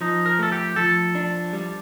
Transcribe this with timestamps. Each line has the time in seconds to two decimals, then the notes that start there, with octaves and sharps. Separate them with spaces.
0.01 F3 D#4
0.26 A#4
0.39 A3 A4
0.52 G4
0.76 F3 A4
1.15 D4
1.53 G3